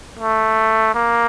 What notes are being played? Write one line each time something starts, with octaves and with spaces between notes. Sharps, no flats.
A3
A#3